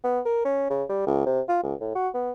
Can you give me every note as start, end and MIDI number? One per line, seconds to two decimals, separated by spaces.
0.04 0.20 59
0.25 0.44 70
0.45 0.66 61
0.70 0.84 49
0.89 1.03 55
1.07 1.22 37
1.26 1.41 48
1.49 1.60 65
1.63 1.75 37
1.81 1.91 45
1.96 2.09 66
2.14 2.32 59